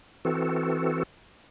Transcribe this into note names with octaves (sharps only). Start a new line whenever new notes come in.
E3 C4 F#4 A4